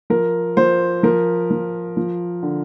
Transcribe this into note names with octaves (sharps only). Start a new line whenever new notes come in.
F3 A#4
F3 C5
F3 A#4
F3
F3
D3